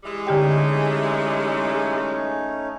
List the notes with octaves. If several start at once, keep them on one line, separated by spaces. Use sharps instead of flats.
E3 G3 G#3
D3 A3 C#4 D#4 G4 G5